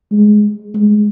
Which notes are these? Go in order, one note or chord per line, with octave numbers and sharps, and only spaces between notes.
G#3
G#3